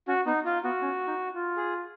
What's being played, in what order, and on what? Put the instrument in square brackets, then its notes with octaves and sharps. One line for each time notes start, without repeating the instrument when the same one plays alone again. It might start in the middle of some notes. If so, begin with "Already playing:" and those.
[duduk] C#4 [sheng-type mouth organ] F#4
[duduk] B3 [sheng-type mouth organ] D#4
[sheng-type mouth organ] F4
[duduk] B3 [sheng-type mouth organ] F#4
[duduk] C#4
D#4
F4
[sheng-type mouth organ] G#4